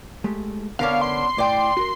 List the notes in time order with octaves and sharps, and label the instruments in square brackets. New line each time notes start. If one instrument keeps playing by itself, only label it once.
[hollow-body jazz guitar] G#3 A3 G4
[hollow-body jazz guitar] D3 A#4 C#5 [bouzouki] B3 C#4 D4 [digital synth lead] F5
[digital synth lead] C6
[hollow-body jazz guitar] A2 [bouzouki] D5 G5
[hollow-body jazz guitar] F#4 A#4